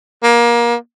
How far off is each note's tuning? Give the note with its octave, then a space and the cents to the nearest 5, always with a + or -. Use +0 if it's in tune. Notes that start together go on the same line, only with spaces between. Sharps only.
A#3 +25